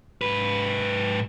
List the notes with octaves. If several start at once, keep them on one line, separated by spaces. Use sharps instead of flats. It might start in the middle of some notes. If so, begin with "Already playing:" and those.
G#2 B4